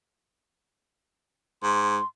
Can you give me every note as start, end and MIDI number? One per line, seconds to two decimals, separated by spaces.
1.63 1.98 44
1.63 2.06 84